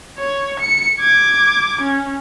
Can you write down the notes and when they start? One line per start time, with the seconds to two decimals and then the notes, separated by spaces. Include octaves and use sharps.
0.18 C#5
0.60 C#7
1.00 D6 G#6
1.82 C#4